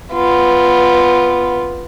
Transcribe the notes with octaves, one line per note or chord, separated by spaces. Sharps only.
B3 F4